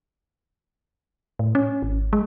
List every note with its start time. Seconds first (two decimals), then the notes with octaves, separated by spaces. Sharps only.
1.39 A2
1.55 C#4
1.83 G#1
2.13 G#3